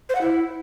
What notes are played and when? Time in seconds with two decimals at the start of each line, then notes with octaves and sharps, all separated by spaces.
0.09 C5
0.15 F#5
0.21 E4